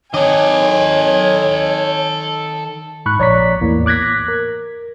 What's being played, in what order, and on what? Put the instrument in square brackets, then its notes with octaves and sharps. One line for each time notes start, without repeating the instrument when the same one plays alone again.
[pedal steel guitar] D#3 D6 [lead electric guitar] A4 D#5 [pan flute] C#5 [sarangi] G#5
[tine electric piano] G#2 B5 C#6 F#6
A#1 C#5 D5 A#5 C#6 B6
E2 A2 E3 A#3
D6 F#6 G#6 A#6 B6
A#4